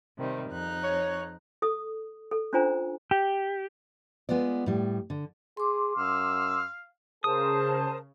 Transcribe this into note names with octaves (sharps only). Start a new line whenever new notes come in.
C3 D#3 G3
F2 D#4 F#6
C#5
A4 D#6
A4
C#4 D4 F4 C5 G#5 A#5
G4
G#3 B3 F4 D5
A2 G3
D3
G#4 C6 D6
F#2 F5 E6
C#3 G#4 A#4 C5 A5 D#6